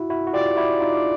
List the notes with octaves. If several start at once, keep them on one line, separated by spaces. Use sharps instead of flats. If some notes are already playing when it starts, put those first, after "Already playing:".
Already playing: E4 F#4
E4 F#4
F#4
F4 G4 D5
E4 F#4
D#4 F4